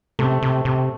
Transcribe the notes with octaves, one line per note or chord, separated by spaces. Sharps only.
C3 A3
C3
C3